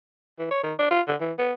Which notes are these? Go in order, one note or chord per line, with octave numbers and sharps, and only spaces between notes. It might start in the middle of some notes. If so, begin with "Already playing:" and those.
E3
C#5
D#3
D4
F4
D3
E3
B3